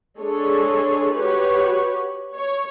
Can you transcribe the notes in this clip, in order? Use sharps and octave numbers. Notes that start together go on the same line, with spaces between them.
G#3 D4 G#4 A4 C#5
F#4 G4 B4 C#5
C#5